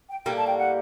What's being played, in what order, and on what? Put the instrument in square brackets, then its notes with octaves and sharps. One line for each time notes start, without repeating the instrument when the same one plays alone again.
[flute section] G5
[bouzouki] A2 G3 A#3 [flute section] G5
[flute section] A5
G5
F#5